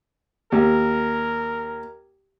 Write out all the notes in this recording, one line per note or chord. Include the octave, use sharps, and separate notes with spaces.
D#2 A#4